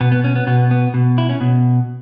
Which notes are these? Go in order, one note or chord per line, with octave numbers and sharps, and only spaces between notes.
B2 B3
B3
C#4
B3
B2 B3
B3
B2
E4
C#4
B2